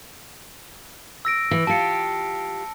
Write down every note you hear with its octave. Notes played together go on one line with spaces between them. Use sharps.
E6 A#6 D7
E3
F4 G4 A5 C#7